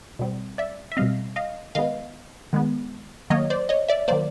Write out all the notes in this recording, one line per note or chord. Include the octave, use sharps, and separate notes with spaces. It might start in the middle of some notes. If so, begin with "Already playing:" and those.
B2 G3 C4
D5 E5
E5
B2 G3 C4 D#5 F5
D#5 F5
D#3 G#3 B3 D#5 F5
D#3 G#3 B3
D#3 F#3 A#3 C#5 D#5
C5 D5
C#5 D#5
D5 E5
D#3 F#3 A#3 C5 D5